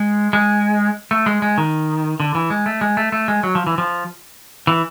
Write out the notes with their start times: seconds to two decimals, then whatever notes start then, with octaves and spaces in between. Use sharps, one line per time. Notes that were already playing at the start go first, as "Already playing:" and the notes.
Already playing: G#3
0.33 G#3
1.11 A3
1.26 G#3
1.42 G#3
1.58 D#3
2.20 D3
2.35 E3
2.50 G#3
2.66 A3
2.81 G#3
2.97 A3
3.12 A3
3.28 G#3
3.43 F#3
3.55 F3
3.67 E3
3.78 F3
4.67 E3